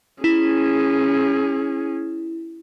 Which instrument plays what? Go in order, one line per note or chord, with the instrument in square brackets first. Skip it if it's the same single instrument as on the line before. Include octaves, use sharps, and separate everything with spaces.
[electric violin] C#4 G#4 [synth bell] E4